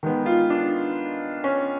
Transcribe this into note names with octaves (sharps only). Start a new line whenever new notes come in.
D#3 G#3 B3
F4
D4
C#4